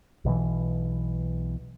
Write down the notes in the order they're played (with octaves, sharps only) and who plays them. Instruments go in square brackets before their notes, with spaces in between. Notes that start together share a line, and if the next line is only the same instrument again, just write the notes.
[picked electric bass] B1 B2 D3 E3